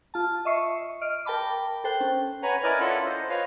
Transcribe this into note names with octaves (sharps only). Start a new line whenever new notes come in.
F4 A5
D#5 E5 C#6 C7 C#7
D#5 F6 D7
A#4 G5 A5 B5 D6
A4 C5 G5 F#6
C#4
B4 C#5 F#5 G#5 A#5
E4 A#4 B4 D5 D#5 G#5
C#4 E4 F4 A4 F#5
C5 D#5
F4 B4 C#5 D#5 F5